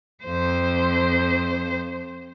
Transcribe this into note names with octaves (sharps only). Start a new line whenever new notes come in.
F2 C5